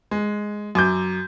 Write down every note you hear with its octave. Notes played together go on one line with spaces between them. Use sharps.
G#3
F#2 D6 G6